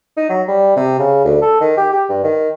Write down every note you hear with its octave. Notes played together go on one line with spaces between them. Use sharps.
D#4
F#3
G3
C3
C#3
D2
A4
D#3
G4
G4
G2
D#3